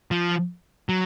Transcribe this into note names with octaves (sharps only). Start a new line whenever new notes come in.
F3
F#3